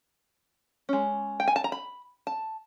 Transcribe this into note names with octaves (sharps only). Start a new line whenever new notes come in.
G#3 C#4
G5
G#5
A5
A#5
B5
A5